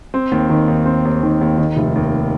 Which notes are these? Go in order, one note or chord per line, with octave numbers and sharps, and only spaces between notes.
C4
D#2
D#3
D#2
C4
D#2
D#3
D#2
D#3
F1
D#2